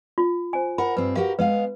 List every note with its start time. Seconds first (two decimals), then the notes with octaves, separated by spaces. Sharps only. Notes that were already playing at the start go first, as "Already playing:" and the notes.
0.18 F4
0.53 C5 G#5
0.78 A#4 F#5 B5
0.97 G2 C4 B4
1.16 F#4 G4 A#4 F5
1.39 G#3 B3 B4 F5